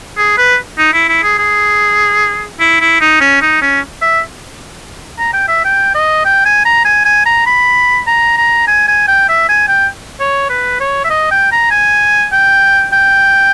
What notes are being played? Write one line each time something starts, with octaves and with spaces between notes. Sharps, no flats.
G#4
B4
D#4
E4
E4
G#4
G#4
E4
E4
D#4
C#4
D#4
C#4
E5
A#5
G5
E5
G5
D#5
G5
G#5
A#5
G#5
G#5
A#5
B5
A#5
A#5
G#5
G#5
G5
E5
G#5
G5
C#5
B4
C#5
E5
D#5
G5
A#5
G#5
G5
G5